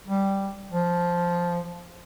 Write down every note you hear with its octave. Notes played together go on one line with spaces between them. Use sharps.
G3
F3